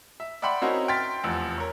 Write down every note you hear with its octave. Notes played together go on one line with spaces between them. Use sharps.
E5
D5 E5 F#5 G5 B5 C6
C4 C#4 D#4 E4 F#4 A#4
G5 C6 F6 A6 B6
F1 E2 F3 E6
A#4 C#5